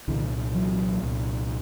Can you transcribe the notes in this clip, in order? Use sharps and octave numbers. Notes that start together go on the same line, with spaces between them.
C2 A#2 D3 E3
E3 F#3
C2 A#2